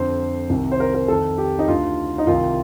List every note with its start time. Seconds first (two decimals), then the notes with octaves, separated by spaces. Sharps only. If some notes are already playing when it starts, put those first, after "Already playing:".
Already playing: F2 D3 C5
0.50 C2 C3 D#3
0.71 C5
0.80 A#4
0.94 A#4
1.08 F2 D#3 A4
1.38 G4
1.59 D#4
1.68 D2 D3 F4
2.18 D#4
2.27 C2 C3 D#3 F4